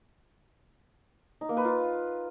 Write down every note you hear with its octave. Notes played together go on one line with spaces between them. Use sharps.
D#4
A#3
B4
F4